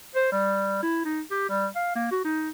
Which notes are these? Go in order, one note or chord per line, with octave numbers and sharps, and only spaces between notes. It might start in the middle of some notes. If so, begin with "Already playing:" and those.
C5
G3
E4
D#4
G4
G3
F5
A#3
F#4
D#4